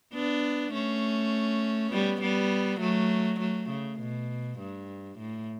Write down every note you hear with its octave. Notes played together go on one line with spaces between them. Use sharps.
B3 D4
A3 C#4
G3 B3
G3 B3
F#3 A3
F#3 A3
C#3
B2
G2
A2